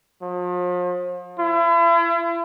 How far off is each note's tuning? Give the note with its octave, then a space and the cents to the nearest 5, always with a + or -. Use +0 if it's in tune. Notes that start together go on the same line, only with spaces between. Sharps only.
F3 +40
E4 +40